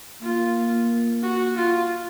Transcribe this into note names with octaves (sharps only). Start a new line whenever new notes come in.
A#3 F4
F#4
F4